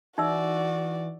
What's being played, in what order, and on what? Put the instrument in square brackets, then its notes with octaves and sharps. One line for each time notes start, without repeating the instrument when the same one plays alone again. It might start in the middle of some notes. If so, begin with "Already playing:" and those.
[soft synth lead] E3 [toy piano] D#4 E5 E6 [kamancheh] F#4 D5